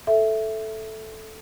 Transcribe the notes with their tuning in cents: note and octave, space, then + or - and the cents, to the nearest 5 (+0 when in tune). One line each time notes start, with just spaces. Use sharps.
A4 -5 E5 +0